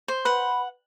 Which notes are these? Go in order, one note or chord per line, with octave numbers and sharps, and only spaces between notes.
C5
B4 F#5